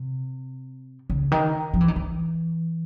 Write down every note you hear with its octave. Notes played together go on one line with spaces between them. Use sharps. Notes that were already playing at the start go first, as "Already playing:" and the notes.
Already playing: C3
C#3
D#3
F3
E3
D#3
E3